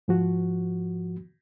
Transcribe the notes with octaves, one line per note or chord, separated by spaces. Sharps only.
G#2 F3 F#4